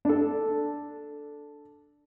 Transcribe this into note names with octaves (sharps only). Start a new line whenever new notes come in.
D4 A4